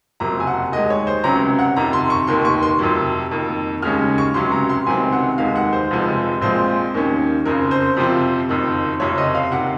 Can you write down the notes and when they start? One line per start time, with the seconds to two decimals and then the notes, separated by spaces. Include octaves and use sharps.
0.20 F#1 F2 C3 F#3 A#3 A#5
0.40 G#5
0.47 F#5
0.72 D#2 D#3 G#3 D#5
0.90 C#5
1.07 C5
1.24 C#2 C3 F#3 C#4 A#5
1.59 F#5
1.76 F2 C3 D#3 A#5
1.93 C6
2.10 C#6
2.27 F1 D#2 D#3 A#3 C6
2.45 C#6
2.63 C6
2.79 F2 C3 F#3
3.31 F2 D#3 A#3
3.82 D#2 C#3 G#3 C#4 F6
4.18 C#6
4.34 C#2 C3 F#3 C#4 C6
4.52 A#5
4.69 C6
4.87 C#2 C3 D#3 F#3 C4 G#5
5.12 F#5
5.38 F1 D#2 D#3 G#3 F5
5.56 F#5
5.73 C5
5.90 F1 F2 C3 F3 G#3
6.41 A#1 A#2 F3 G#3 C4 C5
6.94 D#2 D#3 A#3 C#4
7.46 F#1 F2 C#3 A#4
7.71 C5
7.97 F2 C3 F3 C4
8.49 F#1 F2 D#3
9.00 F#1 F2 C3 C#5
9.18 D#5
9.35 F5
9.52 C3 D#3 F#5